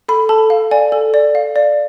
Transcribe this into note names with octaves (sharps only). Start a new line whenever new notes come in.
A4 B5
A4 A5
F5
D5 G#5
A4
D5
F5
D5